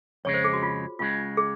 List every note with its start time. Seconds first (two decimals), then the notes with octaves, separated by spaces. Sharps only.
0.25 F2 C#3 G#3 C#5
0.34 C5
0.44 G#4
0.53 F#4
0.63 F4
0.99 C#2 C#3 G#3 F4
1.37 G#4